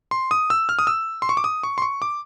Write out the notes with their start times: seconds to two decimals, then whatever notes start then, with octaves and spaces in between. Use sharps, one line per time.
0.11 C6
0.31 D#6
0.50 E6
0.69 F6
0.79 D#6
0.87 E6
1.22 C6
1.29 C#6
1.37 D6
1.44 D#6
1.63 C#6
1.78 C6
1.82 C#6
2.02 D6